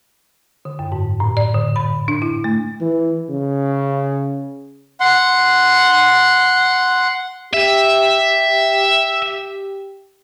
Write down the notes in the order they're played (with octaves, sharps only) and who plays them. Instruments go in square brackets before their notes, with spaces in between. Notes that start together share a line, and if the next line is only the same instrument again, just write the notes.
[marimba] D3
F#2
G#2
A2
D5
D3
B5
D4
E4
A3
[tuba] E3
C#3
[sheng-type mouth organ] F#5 C6
[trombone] G4 [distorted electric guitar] E5